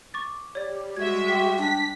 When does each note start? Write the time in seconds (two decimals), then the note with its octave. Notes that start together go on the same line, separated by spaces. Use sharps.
0.14 C#6 D6 A6
0.55 G4 C#5 D5
0.96 G3 G#3 F#4 E5 G#6
1.28 G5 C6 D6 B6
1.58 D4 G#5 B6